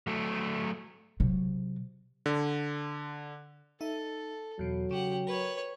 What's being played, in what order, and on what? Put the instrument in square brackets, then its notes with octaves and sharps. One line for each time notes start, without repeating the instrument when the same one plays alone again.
[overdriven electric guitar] F#3 A3
[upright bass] C3 F#3
[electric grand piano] D3
[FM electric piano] D#4 E5 [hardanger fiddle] A4
[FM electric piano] E2 B2 [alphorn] F#3
[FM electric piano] C#3 [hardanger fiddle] G4 F#5
[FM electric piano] A#4 [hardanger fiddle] B4 C#5